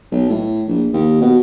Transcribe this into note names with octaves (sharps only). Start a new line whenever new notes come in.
B1
A2
A#1
D#2
B2